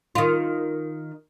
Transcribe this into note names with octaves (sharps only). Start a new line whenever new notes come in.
D#3 F4